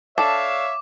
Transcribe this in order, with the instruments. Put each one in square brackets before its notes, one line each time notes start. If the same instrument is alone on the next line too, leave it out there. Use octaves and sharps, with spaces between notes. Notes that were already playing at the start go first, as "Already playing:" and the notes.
[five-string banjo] D4 A4 [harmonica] C#5 E5 F5 [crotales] D6 E7